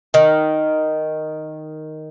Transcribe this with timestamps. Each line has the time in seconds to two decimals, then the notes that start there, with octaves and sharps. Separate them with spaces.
0.14 D#3